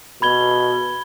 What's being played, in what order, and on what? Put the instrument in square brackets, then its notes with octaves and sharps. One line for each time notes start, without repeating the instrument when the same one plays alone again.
[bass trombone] B2 [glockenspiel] B5 G#6 G7